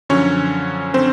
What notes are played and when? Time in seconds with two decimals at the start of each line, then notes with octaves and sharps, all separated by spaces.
0.10 F#2 D3 F3 C#4 C#5
0.94 D3 C4 C5